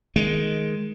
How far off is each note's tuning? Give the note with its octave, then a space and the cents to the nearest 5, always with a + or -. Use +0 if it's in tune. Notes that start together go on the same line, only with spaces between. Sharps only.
D#3 +5 G#3 +10